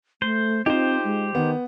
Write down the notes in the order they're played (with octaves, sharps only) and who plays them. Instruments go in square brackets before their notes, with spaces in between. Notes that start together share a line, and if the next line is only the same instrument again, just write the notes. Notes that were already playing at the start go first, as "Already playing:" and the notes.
[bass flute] A3 [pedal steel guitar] C5
[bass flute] C4 [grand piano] D#4 F4 [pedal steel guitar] G4 C5
[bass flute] G#3
[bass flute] D#3 [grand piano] B3